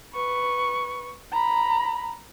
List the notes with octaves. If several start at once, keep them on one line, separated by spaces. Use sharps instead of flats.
B4 C#6
A#5 B5